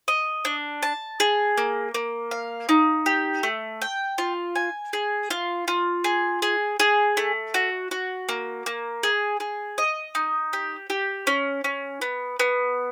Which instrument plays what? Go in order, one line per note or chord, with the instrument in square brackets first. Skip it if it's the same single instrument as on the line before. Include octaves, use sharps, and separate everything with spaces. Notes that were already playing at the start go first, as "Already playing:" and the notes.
[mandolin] D#5
D4
A5
G#4
A#3
A#3
F5
D#4
G4
A3
G5
F4
G#5
G#4
F4
F4
G#4
G#4
G#4
A3
F#4
F#4
A#3
A#3
G#4
G#4
D#5
D#4
G4
G4
C#4
C#4
B3
B3